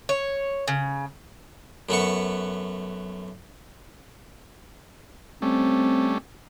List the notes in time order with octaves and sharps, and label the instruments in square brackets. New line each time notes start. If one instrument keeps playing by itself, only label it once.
[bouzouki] C#5
C#3
[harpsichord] F#2 A3 B3 C#6
[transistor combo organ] G3 A3 C#4 [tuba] C4